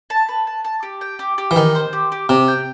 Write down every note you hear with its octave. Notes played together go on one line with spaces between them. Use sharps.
A5
B4
A5
A5
G4
G5
G4
G4
E3
D#3 D#5
C5
G4
G4
C3 G4
G5